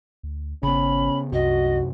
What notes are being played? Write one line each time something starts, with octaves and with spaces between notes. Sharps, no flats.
D2
G#1 C#3 B3 C#4 B5
C2 F#2 C3 F#4 D#5